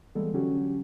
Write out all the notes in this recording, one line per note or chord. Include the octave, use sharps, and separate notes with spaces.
E3 G3 G#3 A#3 B3 A4
D3 F#3 C#4 F#4 G4